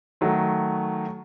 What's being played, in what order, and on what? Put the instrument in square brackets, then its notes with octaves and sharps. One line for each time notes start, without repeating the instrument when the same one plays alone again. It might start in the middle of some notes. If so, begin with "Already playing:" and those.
[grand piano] D#3 F#3 A3